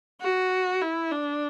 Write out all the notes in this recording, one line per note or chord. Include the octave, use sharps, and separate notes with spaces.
F#4
E4
D4